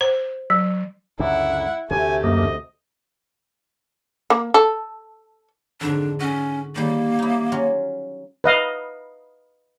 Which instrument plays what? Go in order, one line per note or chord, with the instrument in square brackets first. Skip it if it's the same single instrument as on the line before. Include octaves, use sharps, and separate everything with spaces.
[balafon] C5
F#3
[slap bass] C#2 F#2 D3 [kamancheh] E4 F#5
[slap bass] D2 C3 [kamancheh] A3 G4 [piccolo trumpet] G#5
[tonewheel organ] F#2 A#3 [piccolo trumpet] D#5
[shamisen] A#3
A4
[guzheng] F2 G#2 D3 [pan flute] D4
[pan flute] C#4 [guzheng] F#4
[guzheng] D#3 G3 [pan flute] A#3
[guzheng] D#4 E4
F#3 C#4 F4
[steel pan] B4 D#5 F5